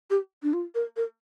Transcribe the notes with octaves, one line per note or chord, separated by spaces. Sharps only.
G4
D4
F4
A#4
A#4